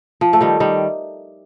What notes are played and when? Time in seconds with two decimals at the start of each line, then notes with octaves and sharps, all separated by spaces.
0.21 F3
0.33 A3
0.41 D#3 G3
0.60 D#3 G3